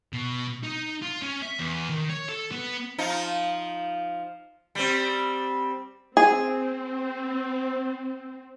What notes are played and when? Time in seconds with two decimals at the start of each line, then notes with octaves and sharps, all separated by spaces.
0.13 B2
0.64 D#4
1.02 F4
1.22 C#4
1.43 E5
1.60 E2
1.90 D#3
2.10 C#5
2.29 A4
2.52 B3
2.98 F3 D#4
4.75 G3 C4
6.17 C4 G#4